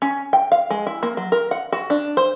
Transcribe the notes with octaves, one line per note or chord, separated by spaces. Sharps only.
C#4
G5
F5
G#3
E4
A#3
F#3
A#4
F#5
F#4
D4
C5